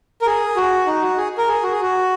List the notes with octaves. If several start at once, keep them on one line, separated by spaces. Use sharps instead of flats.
A#4
G#4
F#4
D#4
F#4
G#4
A#4
G#4
F#4
G#4
F#4